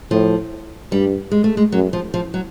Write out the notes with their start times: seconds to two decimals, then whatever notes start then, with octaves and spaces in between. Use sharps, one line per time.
0.11 A2 F3
0.92 G2 G3
1.31 G#3
1.44 A3
1.57 G#3
1.72 F#2 F#3
1.93 F3
2.14 F3
2.34 F#3